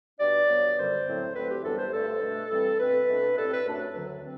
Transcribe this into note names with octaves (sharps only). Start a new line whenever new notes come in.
B2 G3 D4 D5
G2 F#3 B3
F#2 D3 G3 C5
A2 F#3 C4
D2 D3 A3 C4 B4
G4
F#2 E3 G3 B3 D4 A4
C5
G2 D3 A3 D4 A4
B2 A3 D4
G2 E3 G3 C4
B2 A3 C4 B4
B2 A3 D4
A2 G3 C4 A4
B4
F#2 F#3 A3 D4
D2 D3 F#3
C4